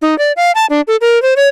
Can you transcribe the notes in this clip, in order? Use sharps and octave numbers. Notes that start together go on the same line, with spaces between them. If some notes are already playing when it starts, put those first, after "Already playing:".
D#4
D5
F5
A5
D4
A4
A#4
C5
C#5